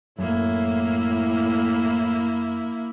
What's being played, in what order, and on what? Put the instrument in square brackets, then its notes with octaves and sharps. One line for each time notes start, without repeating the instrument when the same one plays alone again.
[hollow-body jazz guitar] F#2 [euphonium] A2 [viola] A#3 E4